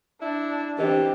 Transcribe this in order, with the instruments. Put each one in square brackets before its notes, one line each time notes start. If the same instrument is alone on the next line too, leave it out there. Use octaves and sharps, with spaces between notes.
[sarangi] D4 [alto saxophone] E4
[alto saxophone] E3 [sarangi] C4 [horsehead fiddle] D4 G4 [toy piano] A#4 D#5